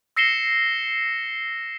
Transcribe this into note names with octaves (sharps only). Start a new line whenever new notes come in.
E6 A#6 C7 C#7 E7 G7